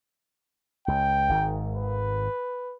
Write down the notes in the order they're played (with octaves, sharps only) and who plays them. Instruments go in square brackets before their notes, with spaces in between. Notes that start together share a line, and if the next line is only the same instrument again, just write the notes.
[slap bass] C#2 [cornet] G5
[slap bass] G#1 G#2 D#3
[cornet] B4